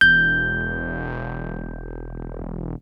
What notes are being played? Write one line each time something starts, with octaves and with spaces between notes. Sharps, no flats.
E1 G6